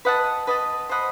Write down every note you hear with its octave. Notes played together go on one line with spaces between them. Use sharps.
B4 D#5 F#5 A5
B4 D#5 F#5 A5
C5 D#5 F#5 B5